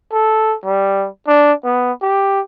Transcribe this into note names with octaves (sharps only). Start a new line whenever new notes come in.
A4
G3
D4
B3
G4